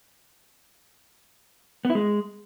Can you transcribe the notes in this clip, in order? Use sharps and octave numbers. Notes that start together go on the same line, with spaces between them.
B3
E4
G#3